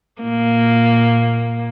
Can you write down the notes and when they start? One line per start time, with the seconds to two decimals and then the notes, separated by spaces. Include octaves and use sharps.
0.22 A#2 A#3